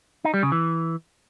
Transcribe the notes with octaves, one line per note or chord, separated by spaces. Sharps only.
D#4
G3
C#3
E3